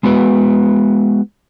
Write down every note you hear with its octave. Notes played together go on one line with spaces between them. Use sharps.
G#3 B3 F#4 B4